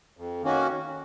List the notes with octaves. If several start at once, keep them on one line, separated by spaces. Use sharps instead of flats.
F2
D#3 A#3 C#4 F#4